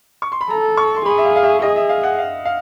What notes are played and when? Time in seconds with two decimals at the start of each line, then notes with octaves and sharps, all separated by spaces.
0.22 C#6
0.32 C6
0.41 B5
0.50 A4 A#5
0.77 C#6
0.96 C6
1.06 G#4 B5
1.18 E5
1.25 F5
1.36 F5
1.43 E5
1.62 G#4 D#5
1.76 E5
1.89 F5
2.03 F#5
2.19 F5
2.45 F5